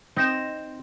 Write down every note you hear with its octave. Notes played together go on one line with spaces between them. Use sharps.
C4 D#4 A#6 E7